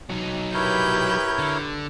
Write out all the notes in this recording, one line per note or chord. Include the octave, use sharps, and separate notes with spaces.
F#3 D#4
E4 G4 A#4 B4 C#5 G6
D3